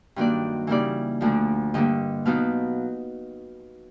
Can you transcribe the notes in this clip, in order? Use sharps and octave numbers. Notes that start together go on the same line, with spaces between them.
G2 D#3 F#3 A#3 D4 D5
C#3 E3 G3 A#3 D#4 D5
D2 D3 F3 A3 D4
G2 D3 G3 A#3 D#5
B2 F#3 B3 D#4 F5